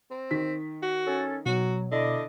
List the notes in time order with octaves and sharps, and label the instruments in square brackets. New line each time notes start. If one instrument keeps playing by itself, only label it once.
[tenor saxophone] C4
[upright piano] D#3 B6
[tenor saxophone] F#4
[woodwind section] C#4 A4
[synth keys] B2 [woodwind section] F#3 [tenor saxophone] F#4
[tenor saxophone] D3 [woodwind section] E4 D5 D#5